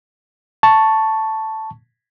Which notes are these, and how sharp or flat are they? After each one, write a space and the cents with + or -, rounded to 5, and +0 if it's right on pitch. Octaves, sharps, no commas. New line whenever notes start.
A5 +0 C#6 +0